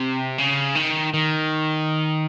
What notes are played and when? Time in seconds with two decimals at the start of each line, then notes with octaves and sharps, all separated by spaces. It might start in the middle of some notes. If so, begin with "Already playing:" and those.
Already playing: C3
0.39 C#3
0.76 D#3
1.14 D#3